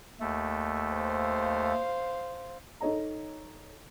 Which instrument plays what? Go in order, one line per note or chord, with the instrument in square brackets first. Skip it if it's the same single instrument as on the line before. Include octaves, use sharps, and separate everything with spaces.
[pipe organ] D#2 A3
[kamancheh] C5 F5
[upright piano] D#4 A4 C#5 D#5 A#5